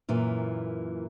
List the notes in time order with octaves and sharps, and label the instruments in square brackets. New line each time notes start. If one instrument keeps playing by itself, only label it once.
[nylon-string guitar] F#2 A#2 E3